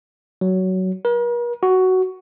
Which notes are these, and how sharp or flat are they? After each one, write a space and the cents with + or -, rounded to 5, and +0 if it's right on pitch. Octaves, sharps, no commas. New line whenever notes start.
F#3 +15
A#4 +45
F#4 +10